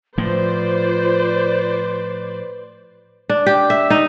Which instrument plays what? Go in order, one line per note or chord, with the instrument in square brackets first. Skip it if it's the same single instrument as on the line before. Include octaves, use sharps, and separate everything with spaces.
[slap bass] A2 F3 [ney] F4 [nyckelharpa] B4 [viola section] C5 D5
[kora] D4
G4
E5
D#4